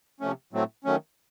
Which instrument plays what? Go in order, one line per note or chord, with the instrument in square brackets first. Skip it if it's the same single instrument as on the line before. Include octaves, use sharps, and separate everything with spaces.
[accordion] C3 F3 A3 C#4
A2 F#3 A3 C4
D#3 F#3 A3 C#4